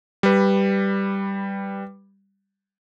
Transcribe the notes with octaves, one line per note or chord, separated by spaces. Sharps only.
G3 B4